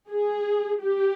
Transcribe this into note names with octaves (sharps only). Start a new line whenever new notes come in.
G#4
G4